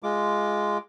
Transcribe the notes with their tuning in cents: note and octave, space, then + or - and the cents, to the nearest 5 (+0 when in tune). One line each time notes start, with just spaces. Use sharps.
G#3 +0 F4 -10 D6 +0